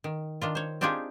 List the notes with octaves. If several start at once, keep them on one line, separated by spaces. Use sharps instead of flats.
D#3
D#3 D4 F4
C5 C#5
C4 D4 D#4 F4 G4 G#4